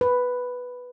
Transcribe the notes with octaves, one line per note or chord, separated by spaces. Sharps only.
B4